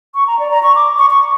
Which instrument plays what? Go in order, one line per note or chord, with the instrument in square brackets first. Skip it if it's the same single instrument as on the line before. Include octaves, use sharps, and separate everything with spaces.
[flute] C#6
A#5
D5
A#5
C#6
D6
C#6
C#6